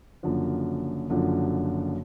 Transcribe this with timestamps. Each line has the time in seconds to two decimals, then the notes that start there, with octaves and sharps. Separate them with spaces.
0.23 F#1 F#2 D3 F3
1.10 F#1 F#2 D3 F3